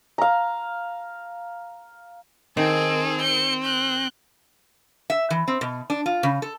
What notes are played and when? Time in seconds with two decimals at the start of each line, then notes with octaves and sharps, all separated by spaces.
0.18 F5 A#5
2.57 D#3 C4 G#4 A4
3.21 G6 C#7
3.63 F#6 G6
5.10 E5
5.30 E3
5.48 C4
5.61 B2
5.90 D4
6.06 F4
6.23 C#3
6.42 A4